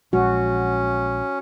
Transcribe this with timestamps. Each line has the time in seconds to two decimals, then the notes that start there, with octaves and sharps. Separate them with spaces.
0.13 A#1 G#3 C#4 F#4